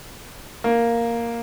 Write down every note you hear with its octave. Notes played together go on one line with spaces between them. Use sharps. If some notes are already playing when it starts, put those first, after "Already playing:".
A#3